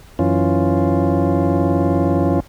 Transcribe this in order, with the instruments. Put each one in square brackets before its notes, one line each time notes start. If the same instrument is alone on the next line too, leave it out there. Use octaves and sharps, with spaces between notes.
[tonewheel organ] F#2 E3 C#4 F4